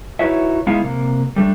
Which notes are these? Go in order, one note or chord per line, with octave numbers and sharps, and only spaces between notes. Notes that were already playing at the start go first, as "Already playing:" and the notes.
D#4 E4 F#4 B4 C#5 E5
G#3 B3 D#4 E4 F5
C3 A#3
G3 A3 D4